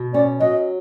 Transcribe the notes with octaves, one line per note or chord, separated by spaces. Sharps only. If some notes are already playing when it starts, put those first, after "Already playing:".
Already playing: B2
C#4 D5
F#3 D#5